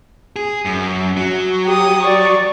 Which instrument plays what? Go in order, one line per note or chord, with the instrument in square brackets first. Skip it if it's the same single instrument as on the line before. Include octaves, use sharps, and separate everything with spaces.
[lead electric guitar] G#4
F#2
F#3
[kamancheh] G4 D#6
D5 C#6